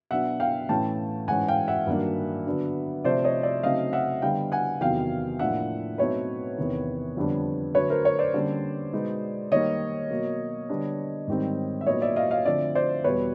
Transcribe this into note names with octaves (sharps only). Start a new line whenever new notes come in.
B2 F#3 B3 D4 E5 F#5
F5 G5
A2 E3 A3 C#4 G5 A5
G#2 E3 G#3 C#4 F#5 G#5
F5 G5
E5 F#5
G2 D#3 F#3 A#3 D4
D3 F#3 B3 D4
C3 F3 A3 C5 D5
C#5 D#5
D5 E5
C#3 F#3 A3 C4 D#4 D#5 F5
E5 F#5
D3 G3 B3 F5 G5
F#5 G#5
E2 C3 D#3 F#3 B3 F5 G5
A2 F3 A#3 D4 E5 F#5
B2 F#3 A3 C4 D#4 B4 C#5
E2 C3 D#3
F2 D3 G3 B3 D4
D3 F#3 A3 B4 C#5
A#4 C5
B4 C#5
C5 D5
D3 G3 A#3 C#4
B2 G#3 B3 D#4
D#3 G3 A#3 D#4 C#5 D#5
B2 F#3 A#3
D3 G3 B3 D4
G#2 D#3 G3 C4 D#4
E5
A#2 F#3 B3 D#4 C#5 D#5
D5 E5
D#5 F5
D#5 F5
D3 F3 A3 C4 D5 E5
C5 D5
E2 B2 G3 B4 C#5